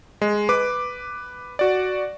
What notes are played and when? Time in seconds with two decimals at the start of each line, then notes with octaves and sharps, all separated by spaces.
0.22 G#3
0.49 B4 D6
1.59 F#4 D5